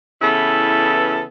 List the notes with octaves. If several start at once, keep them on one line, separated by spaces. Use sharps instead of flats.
C#3 E3 B3 E4 A4